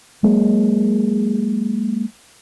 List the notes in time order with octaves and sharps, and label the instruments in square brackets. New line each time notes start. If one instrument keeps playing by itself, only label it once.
[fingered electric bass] F#3 G#3 A#3